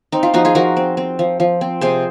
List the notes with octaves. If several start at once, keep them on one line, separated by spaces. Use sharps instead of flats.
C4 D#4
F4
F3 D#4 F#4
F4 G#4
F3 F#4 A#4
C4
C4
F3
F3
C4
C3 G#4 C5